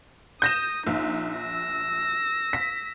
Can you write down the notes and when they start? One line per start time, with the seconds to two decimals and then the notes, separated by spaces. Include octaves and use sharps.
0.42 D#6 G6 A#6 E7
0.87 A#1 D#4
1.38 E6 A#6
2.53 B6